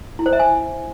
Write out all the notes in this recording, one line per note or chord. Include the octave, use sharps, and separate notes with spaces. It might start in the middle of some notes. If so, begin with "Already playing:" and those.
E4
C5
E5
G#5